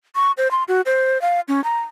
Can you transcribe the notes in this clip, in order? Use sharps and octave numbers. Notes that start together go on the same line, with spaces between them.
C#6
C5
C6
F#4
C5
F5
C#4
A#5